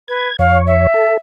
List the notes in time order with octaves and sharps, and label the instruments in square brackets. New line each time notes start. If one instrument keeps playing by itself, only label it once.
[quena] B4 [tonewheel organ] G#6
[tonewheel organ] F2 C#5 [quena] F5
[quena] E5
[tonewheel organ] A4